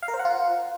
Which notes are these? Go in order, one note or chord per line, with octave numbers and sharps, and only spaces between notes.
F5
A#4
C5
F#5
F4